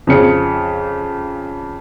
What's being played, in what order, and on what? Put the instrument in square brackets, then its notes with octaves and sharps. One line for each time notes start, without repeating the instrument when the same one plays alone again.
[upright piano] F2 C#3 C#7